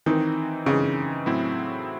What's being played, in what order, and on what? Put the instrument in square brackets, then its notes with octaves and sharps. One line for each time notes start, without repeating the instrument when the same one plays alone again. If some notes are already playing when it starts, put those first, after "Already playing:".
[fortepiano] D#3 [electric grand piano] E3 C4 D#4
[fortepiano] C#3 [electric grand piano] E3 C4 D#4
[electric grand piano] A2 F#3 C4 E4